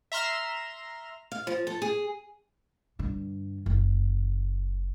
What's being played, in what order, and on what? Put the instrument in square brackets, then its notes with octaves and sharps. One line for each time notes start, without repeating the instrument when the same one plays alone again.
[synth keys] E5 A#5 C6 F6 E7
[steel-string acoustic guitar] F5
F3
A4
G#4
[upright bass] G2 D3
F#1